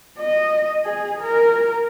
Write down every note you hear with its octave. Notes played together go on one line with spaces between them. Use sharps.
D#5
G#4
A#4